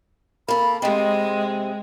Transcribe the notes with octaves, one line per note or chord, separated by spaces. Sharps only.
A#3 A4 B5
C3 G#3 C4 D#5